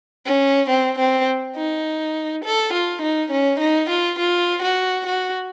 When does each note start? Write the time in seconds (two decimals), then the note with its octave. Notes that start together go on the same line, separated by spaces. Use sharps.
0.26 C#4
0.70 C4
0.98 C4
1.56 D#4
2.44 A4
2.73 F4
3.02 D#4
3.31 C#4
3.60 D#4
3.89 F4
4.19 F4
4.62 F#4
5.06 F#4